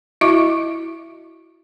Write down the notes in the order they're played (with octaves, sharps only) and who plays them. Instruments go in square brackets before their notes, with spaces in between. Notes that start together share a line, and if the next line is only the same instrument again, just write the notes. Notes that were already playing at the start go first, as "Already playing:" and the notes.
[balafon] E4 F#4 D#5 E5 C#6 D6